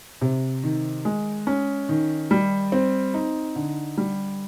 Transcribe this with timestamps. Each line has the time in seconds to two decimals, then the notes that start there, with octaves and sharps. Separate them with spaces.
0.21 C3
0.63 D#3
1.05 G#3
1.47 C#4
1.89 D#3
2.31 G3
2.72 C4
3.14 D#4
3.56 D3
3.98 G3